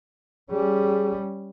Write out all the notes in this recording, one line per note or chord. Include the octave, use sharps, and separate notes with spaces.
G3 C#4 G#4